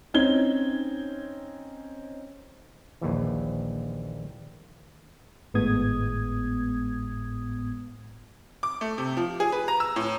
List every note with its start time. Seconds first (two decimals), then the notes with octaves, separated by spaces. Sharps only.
0.14 C4 C#4 D#4 G#6 G7
3.01 A#1 D#2 E3
5.54 G#1 A2 G#3 B3 D#6 G#6
8.63 D6
8.81 A3
8.98 C3
9.17 F3
9.40 G#4
9.52 B4
9.68 A#5
9.80 E6
9.96 A2